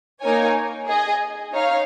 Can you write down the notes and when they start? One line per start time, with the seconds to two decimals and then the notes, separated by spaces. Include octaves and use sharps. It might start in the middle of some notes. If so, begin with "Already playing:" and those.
0.22 A#3 D#4 A#4 C#5 G#5
0.86 G#4 D#5 G#5
1.52 D#4 C#5 F5